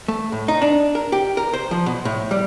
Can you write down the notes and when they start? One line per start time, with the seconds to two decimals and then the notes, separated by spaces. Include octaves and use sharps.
0.08 A3
0.32 A2
0.48 D#4
0.62 D4
0.95 A#4
1.12 G4
1.37 A#4
1.53 C5
1.71 F3
1.86 B2
2.05 A2
2.31 G3